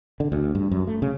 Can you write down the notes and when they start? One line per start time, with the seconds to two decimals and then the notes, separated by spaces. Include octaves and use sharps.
0.20 D3
0.32 D2
0.55 G2
0.71 F#2
0.87 A3
1.02 C#3